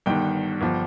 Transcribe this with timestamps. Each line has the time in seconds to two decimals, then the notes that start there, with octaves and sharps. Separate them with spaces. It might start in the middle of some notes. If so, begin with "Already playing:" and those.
0.06 G1 G2 D#3 G5
0.61 G1 F3